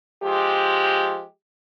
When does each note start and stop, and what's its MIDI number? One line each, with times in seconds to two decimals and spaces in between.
0.23 1.25 53
0.23 1.25 56
0.23 1.25 67